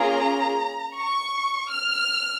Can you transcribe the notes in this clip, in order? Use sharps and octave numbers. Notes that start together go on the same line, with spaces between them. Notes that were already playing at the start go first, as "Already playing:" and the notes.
Already playing: A#3 C#4 F4 G#4 A#5
C#6
F6